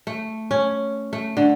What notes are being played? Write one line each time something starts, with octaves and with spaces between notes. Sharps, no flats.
A3
C#4
A3
D3